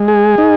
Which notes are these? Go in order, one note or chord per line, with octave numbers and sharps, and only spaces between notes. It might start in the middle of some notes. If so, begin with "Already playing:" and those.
Already playing: G#3
G#4
D#4